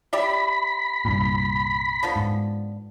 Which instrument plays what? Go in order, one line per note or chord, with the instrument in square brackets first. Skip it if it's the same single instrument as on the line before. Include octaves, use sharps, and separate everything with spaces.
[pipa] G4 D5 E5 [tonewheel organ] B5
[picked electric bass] C2 G2 A#2
[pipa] D3 F3 B3
[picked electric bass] G#2